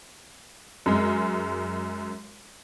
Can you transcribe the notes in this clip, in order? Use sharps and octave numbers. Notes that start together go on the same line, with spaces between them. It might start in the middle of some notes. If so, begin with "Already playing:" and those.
F#2 G#3